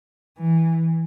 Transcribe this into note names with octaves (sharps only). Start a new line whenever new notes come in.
E3